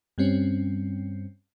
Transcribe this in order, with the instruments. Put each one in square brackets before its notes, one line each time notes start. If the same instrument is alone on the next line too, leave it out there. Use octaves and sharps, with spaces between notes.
[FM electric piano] G2 G3 C4 C#4